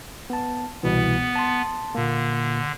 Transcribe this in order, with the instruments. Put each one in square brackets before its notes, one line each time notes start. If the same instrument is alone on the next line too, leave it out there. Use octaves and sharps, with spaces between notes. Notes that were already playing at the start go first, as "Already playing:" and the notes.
[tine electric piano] B3 A5
[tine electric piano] C2 B2 E3 [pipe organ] B3
[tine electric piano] A5 C6
[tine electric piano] A#2 A#3 [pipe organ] D3